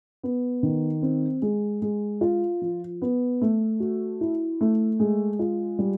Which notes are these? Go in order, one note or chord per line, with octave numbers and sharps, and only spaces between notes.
B3
D#3
C4
G#3
G#3
F4
F3
B3
A3
F#4
E4
A3
G#3
F4
G3